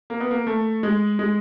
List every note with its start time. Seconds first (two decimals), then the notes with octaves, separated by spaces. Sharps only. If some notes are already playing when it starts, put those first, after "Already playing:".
0.10 A#3
0.20 B3
0.31 A#3
0.47 A3
0.83 G#3
1.19 G#3